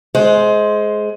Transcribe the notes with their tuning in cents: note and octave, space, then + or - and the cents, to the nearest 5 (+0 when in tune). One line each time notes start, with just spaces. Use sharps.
G#3 +20 C5 +0